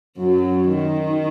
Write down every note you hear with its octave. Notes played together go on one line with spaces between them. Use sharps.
F#2 F#3
D#3